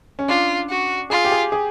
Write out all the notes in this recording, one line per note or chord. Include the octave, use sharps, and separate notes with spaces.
C#4
D4 F4
F#4
F4 G#4
G4
G#4
G#4